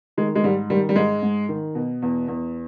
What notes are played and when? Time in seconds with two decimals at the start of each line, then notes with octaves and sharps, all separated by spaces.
0.17 D#3 G#3
0.35 G#3
0.44 G#2 G3
0.70 D#3 G3
0.89 G3
0.96 G#2 G#3
1.22 G#2
1.49 D#3
1.75 B2
2.02 E2
2.28 E2